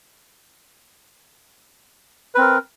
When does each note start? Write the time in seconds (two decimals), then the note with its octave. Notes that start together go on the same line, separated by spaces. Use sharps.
2.35 B4
2.38 C4
2.41 A#4